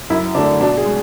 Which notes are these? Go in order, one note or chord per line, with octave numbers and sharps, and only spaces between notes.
F#2 E4
D3 F#3 A3 D4
B2 D4
G#4
G#3